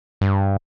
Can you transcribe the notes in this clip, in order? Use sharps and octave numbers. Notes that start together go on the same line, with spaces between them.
G2